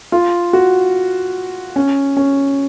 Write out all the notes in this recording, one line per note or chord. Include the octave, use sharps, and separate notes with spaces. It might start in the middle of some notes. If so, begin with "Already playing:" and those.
F4
F#4
C#4
C#4